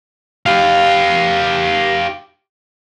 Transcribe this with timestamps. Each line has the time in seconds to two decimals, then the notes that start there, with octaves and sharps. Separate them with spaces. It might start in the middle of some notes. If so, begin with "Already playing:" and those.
0.46 G4 F5